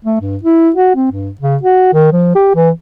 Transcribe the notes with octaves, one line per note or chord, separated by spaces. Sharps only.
A3
G2
E4
F#4
C4
G2
C#3
F#4
D#3
F3
G4
E3